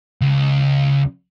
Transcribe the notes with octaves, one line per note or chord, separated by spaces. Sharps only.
C#2